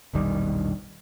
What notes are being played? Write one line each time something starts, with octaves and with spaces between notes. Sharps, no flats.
E1 A#1 D#3 G3